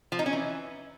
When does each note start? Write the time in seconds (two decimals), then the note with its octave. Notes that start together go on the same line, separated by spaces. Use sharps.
0.12 F3
0.19 D#4
0.26 C#4
0.33 E3